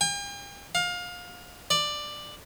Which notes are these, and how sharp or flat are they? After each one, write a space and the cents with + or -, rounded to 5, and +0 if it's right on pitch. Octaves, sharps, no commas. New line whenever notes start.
G5 +45
F5 +25
D5 +10